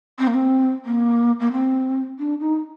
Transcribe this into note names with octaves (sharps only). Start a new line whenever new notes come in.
C4
A#3
C4
A#3
A#3
C4
D4
D#4